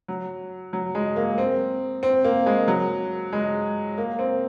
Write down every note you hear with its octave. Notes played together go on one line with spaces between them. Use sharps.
F#3
F#3
G#3
A#3
C4
C4
A#3
G#3
F#3
G#3
A#3
C4